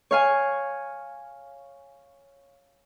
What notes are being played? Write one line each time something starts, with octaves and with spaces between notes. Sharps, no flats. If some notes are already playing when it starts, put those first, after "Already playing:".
C#5 F5 G#5